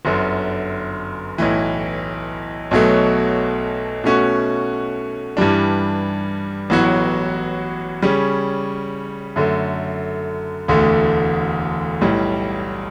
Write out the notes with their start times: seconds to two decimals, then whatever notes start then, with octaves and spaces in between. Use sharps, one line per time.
0.05 G1 F#2 D3
1.38 B1 A2 E3
2.71 B1 B2 F#3 A3
4.04 B2 A3 C#4 F#4
5.37 G2 E3 G3 D4
6.70 A1 A2 F#3 B3 F#4
8.02 C#3 G3 C#4
9.36 F#2 D3 A3
10.68 E1 D2 D3 A3
12.01 B1 A2 G3